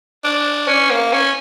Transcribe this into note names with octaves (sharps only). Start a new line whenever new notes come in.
D4
C#4
A#3
C#4